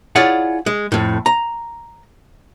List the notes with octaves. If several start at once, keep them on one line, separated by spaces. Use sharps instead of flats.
E4 F4 G#4 C#5 D5 F#5
G#3
F2 A2
A#5